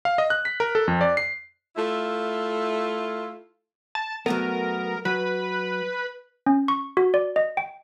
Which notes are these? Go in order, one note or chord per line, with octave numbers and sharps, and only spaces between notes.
F5
D#5
F#6
B6
A#4
A4
F2
D5
C7
A3 E4 F4
A5
F#3 A3 B3 A#4
F#3 B4
C#4
C#6
F#4
D5
D#5
G5